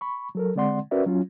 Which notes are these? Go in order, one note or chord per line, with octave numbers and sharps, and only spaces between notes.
B5 C#6
F#3 A4 A#4
D3 G#3 C4 D5 F#5 C6
C#4 F#4 A#4 B4 D5 E5
F#3 C#4 F4